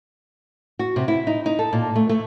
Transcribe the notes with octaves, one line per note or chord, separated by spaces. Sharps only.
F#4
C3
E4
D#4
D#4
A4
A#2
A3
A3